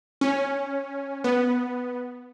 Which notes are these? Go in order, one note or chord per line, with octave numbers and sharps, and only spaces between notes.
C#4
B3